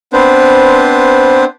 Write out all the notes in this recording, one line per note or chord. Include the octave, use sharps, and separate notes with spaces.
B3 C4 D4 B4 C5